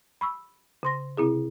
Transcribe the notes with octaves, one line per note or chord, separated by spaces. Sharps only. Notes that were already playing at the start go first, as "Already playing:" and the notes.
B5 C#6 E6
C#3 C6 A#6
C3 C4 E4 G#4